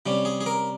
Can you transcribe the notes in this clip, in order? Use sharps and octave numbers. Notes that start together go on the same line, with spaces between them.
C3 G3 C#4
G#4
G#4
A#4